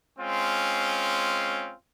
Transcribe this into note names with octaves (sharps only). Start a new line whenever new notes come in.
G#3 C4 C#4 F4